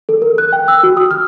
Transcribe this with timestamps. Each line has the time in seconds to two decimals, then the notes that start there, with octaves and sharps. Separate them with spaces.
0.09 A4
0.22 A#4
0.38 F#6
0.53 G5
0.68 E6
0.83 F#4
0.97 D#6
1.11 F6